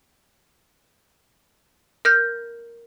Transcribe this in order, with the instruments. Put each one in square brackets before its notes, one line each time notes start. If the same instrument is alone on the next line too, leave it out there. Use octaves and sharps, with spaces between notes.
[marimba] A#4 F6 G6